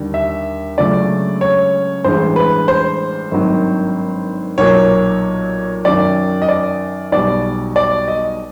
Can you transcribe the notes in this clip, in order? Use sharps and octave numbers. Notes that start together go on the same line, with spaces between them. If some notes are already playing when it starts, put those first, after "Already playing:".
Already playing: D#2 D3 G3
E5
C#2 C#3 F#3 A3 D4 D5
C#5
A1 G2 E3 G#3 C5
B4
C5
G#1 G2 D#3 F#3
B1 A#2 F#3 A#3 C#5
F#2 D#3 F#3 D5
D#5
D5
B1 B2 G3 D5
D5
D#5